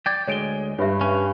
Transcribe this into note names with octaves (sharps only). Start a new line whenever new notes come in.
D5 G5 G#6
D2 G#3 C#5 D7 G7
G2 C#5 E5
C#4